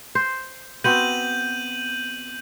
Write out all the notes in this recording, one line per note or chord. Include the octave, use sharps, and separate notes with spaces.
C5
B3 C4 F#4 G6 D#7 F#7